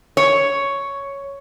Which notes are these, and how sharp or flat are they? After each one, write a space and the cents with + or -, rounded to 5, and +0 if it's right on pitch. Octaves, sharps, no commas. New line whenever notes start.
C#5 +5